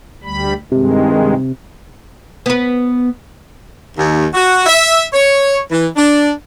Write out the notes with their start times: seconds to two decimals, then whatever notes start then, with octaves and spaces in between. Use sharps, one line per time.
0.23 D2 G3 B5
0.72 G2 C3 D#3 G#3
2.46 B3 B4
3.97 D#2
4.33 F#4
4.66 E5
5.12 C#5
5.71 E3
5.96 D4